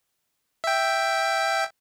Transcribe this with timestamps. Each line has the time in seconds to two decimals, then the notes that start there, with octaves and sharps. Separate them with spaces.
0.64 E5 G5